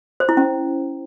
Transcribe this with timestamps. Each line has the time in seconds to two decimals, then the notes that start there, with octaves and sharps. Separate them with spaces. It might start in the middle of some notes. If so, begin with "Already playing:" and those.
0.20 C5
0.29 E4
0.37 C#4